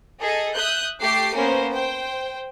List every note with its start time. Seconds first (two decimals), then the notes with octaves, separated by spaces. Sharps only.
0.20 G#4 A4 D#5
0.53 E5 D#6 F#6 G6
0.99 A3 G4 D6 C7
1.35 A#3 B3 C#4 A#4 C5
1.70 C5 G5